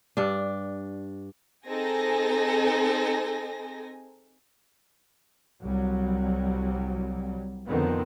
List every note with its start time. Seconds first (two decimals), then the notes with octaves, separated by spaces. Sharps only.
0.17 G2 D4
1.67 C4 D#4 G#4 A4 G#5 A#6
5.62 C2 F#3 G3
7.67 F2 D3 D#3 B3 C4